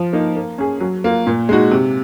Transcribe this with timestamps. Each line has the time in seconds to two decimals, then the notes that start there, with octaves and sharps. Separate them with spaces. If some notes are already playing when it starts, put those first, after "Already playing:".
Already playing: F3
0.13 A#3 D#4
0.36 A#3
0.58 C#4 G#4
0.80 F#3
1.04 A#3 F4
1.27 A#2
1.49 G#3 D#4 F#4
1.71 C3